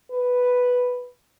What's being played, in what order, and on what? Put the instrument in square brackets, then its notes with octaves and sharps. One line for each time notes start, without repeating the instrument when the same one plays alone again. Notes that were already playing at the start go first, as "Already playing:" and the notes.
[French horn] B4